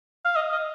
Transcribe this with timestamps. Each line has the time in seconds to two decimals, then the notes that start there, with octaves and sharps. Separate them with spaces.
0.25 F5
0.35 D#5
0.52 D#5